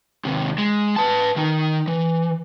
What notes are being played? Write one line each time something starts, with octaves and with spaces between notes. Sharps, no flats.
D#2 C3
G#3
B4 A5
D#3 D#4
E3